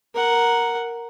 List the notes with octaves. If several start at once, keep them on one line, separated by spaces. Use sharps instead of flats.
A#4 F#5